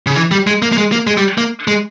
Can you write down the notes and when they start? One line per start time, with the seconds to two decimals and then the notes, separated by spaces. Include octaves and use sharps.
0.07 C#3
0.16 E3
0.31 G3
0.47 G#3
0.62 A#3
0.72 A#3
0.78 G#3
0.92 A#3
1.07 G#3
1.17 G3
1.38 A#3
1.68 G#3